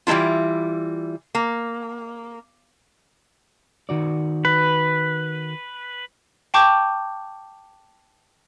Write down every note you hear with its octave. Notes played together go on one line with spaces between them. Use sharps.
E3 G3 A3 E4 F4
A#3
D#3 F#4 D5
B4
G5 A5 C#6 D6 G6